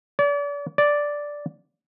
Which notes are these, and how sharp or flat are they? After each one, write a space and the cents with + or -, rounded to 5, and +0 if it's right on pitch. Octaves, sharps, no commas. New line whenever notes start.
D5 -40
D5 -5